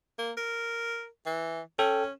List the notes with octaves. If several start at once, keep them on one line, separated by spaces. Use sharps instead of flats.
A#3
A#4
E3
C#4 A4 G5